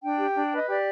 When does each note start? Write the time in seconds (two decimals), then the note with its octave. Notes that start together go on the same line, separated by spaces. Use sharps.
0.03 D4 G5
0.20 G4
0.36 D4
0.52 B4 D#5
0.68 G4 D5